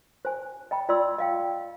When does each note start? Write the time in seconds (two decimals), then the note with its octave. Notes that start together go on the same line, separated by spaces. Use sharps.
0.25 C5 G#5
0.71 D#5 G5 B5
0.89 F4 D5 D#5 C6 E6
1.18 D#5 F5 G5